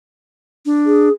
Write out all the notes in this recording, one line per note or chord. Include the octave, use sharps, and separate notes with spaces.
D4
G#4